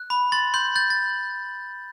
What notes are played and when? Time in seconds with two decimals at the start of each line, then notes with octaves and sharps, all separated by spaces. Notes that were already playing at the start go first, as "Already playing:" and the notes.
Already playing: F#6
0.10 B5
0.32 C6 A6
0.54 C6 G6
0.76 G6 A6
0.90 A6